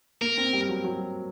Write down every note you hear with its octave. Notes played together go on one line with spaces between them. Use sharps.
A#3 A#4
C4
G3
F#3
F#3